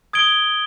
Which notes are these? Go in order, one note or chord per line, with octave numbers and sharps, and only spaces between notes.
D#6 G#6 D7 G7